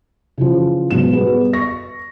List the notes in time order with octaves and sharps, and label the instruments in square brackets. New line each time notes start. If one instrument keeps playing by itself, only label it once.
[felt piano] C#3 E3 F3
G#2 B2 F#3 E7
G3 B3 G#4 B4
C#6 A#6